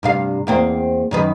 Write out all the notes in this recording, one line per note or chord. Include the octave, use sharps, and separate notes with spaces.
G2 C3 F5
E2 A#3 C4
F#2 D#3 B4